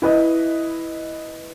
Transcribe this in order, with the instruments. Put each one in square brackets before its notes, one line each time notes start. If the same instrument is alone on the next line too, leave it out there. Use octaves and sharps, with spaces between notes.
[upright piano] E4 B4 D#5